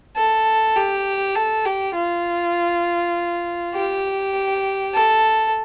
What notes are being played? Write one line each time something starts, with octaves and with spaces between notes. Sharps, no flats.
A4
G4
A4
G4
F4
G4
A4